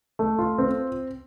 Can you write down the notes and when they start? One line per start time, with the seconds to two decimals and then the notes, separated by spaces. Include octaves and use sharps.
0.19 A3
0.39 F4
0.58 C4